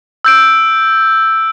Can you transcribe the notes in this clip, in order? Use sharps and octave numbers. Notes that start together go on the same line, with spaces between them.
E6 G6 D7